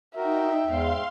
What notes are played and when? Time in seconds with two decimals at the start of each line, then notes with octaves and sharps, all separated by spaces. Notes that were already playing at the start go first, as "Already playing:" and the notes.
0.17 D#4 F#4 A#4 E5 G5
0.66 E2 G#2 F5 C6